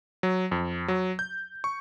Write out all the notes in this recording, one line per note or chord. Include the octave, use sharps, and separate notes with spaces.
F#3
F2
F#3
G6
C#6